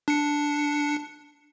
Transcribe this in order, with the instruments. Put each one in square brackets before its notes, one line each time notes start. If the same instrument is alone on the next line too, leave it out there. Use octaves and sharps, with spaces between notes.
[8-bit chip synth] D4 C#7